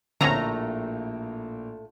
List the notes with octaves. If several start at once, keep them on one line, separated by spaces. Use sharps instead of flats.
A#1 A2 D3 A3 A#3 C4 C#4 A#5